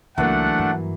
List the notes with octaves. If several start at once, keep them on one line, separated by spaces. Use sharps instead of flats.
C#2 E3 F#3 A3 A#3 D4 F#5
G2